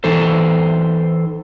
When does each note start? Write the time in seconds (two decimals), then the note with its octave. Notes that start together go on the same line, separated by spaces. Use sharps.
0.04 E3 D#4 A4 C5